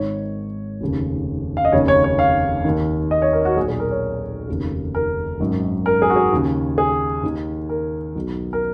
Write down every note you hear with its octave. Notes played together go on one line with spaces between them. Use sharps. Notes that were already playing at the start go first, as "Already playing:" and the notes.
Already playing: G#1 G#2 D#3 C#5
F1 D#2 C#3
F5
D#5
F1 D#2 C#3 C#5
C#5
C#5
F5
D#2 D#3
D#5
C#5
A#4
F#4
B1 A#2 G#4
G#4
A#4
C#5
F1 D#2 C#3
A#4
G#1 F#2 D#3
A#4
G#4
F#4
G#4
D#2 C#3
G#4
D#2 D#3
A#4
B1 B2
A#4